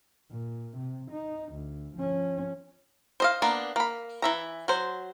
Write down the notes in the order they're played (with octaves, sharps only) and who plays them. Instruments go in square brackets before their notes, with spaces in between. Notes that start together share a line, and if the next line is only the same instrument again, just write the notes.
[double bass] A#2
C3
D#4
D2
F3 C#4
[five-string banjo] C5 D#5 F5
A#3 B3 D4
A#3 B5
E3 E5 A#5
F#3 C5